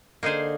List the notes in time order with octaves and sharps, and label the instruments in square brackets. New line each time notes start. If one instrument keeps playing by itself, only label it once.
[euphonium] D3 [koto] A#3 D#4 G#4 C5